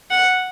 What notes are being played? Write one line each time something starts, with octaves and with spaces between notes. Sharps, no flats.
F#5